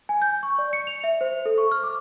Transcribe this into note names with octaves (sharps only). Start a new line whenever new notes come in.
G#5
G6
C#6
D5
C#7
F7
E5
C5
A4
C#6
F6
D6